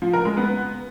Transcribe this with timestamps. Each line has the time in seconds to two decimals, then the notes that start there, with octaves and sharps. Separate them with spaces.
0.02 F3
0.13 A#4
0.25 G#3
0.37 B3